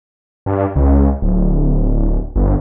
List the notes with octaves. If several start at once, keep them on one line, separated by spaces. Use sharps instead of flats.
G2
C#2
D1
G1